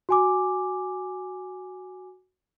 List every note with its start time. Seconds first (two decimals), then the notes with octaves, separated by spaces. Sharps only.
0.09 F#4 G#5 D6